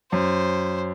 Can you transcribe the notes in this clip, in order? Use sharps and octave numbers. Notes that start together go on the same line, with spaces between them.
F#2 C5